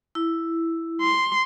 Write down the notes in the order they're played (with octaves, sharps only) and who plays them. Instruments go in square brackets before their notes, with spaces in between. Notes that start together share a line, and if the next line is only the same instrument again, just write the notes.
[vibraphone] E4
[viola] C6